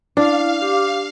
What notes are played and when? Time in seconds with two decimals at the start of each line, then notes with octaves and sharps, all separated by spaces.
0.17 D4 E4 F5
0.62 G4 D6